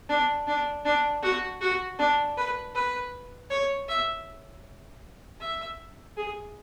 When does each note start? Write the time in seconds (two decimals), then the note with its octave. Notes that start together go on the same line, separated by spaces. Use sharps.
0.09 D4
0.47 D4
0.85 D4
1.22 F#4
1.61 F#4
1.99 D4
2.37 B4
2.75 B4
3.50 C#5
3.88 E5
5.40 E5
6.16 G#4